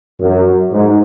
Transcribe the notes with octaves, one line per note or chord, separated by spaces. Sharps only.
F#2
G#2